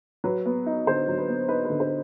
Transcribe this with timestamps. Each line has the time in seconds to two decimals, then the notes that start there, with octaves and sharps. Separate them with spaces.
0.24 F#3 B4
0.46 B3
0.66 D#4
0.87 D3 C5
1.08 F#3
1.18 B4
1.28 B3
1.49 D#4 B4
1.65 B4
1.70 D3
1.80 C5